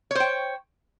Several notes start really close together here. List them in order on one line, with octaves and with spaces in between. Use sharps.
C#5 C5 G5